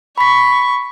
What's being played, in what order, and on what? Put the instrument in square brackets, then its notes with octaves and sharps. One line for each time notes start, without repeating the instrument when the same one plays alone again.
[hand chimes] B5 B6 [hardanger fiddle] C#6